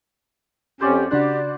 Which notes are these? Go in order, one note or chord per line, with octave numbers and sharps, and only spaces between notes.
F2 C#4 G4 C5 D5 F#5
C#3 D4 F#4 G4 B4 C5 D5 F#6